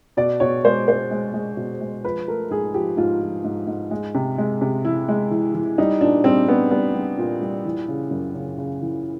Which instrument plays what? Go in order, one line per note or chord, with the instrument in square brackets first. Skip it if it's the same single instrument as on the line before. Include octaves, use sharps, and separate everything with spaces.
[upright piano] B2 D5
B2 C#5
G#3 C5
G#3 C5
G#3
G#3
B2
G#3
F3 B4
A3 A#4
G#2 G#4
F3 G4
G#2 F4
F3
G#2
G#2
G#3
C3
G#3
C3
E3 E4
G#3
E3
E3
G3 D#4
A#2 D4
G3 C4
G3 B3
G3 B3
G3
A#2
G3
E3
C#3
F#2
C#3
C#3
E3